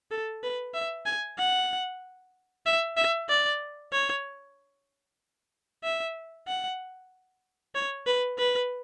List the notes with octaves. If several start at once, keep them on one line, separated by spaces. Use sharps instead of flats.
A4
B4
E5
G#5
F#5
E5
E5
D5
C#5
E5
F#5
C#5
B4
B4